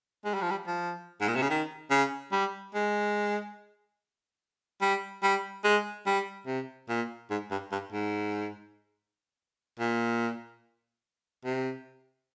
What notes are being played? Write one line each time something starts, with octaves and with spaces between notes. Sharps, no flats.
G#3
G3
F3
G3
F3
G#2
A#2
C3
C#3
D#3
C#3
G3
G#3
G3
G3
G#3
G3
C3
A#2
G#2
G2
G2
G#2
A#2
C3